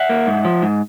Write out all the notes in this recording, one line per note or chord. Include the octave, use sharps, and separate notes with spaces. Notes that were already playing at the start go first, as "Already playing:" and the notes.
Already playing: E5 F#5
A#3
G#2
F3
G#2